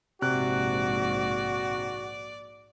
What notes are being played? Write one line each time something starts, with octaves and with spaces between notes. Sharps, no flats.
A#1 G#2 C3 F#4 D5 F#6